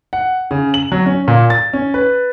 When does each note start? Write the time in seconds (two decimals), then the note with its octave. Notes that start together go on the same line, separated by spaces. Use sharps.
0.13 F#5
0.51 C#3
0.74 F#7
0.92 F#3
1.06 C#4
1.28 A#2
1.50 A6
1.73 C#4
1.94 B4